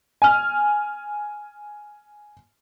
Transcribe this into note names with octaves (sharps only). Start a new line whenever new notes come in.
G#5 F6